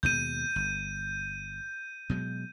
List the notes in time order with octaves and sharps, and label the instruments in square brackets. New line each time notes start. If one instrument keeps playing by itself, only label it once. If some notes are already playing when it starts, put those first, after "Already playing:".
[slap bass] D#2 B2 G#3 [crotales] G6 D#7
[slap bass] G1
B2 F#3 G#3